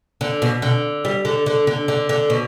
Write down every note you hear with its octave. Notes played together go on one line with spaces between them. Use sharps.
D3
B2
D3
G3
D3
D3
D3
D3
D3
B2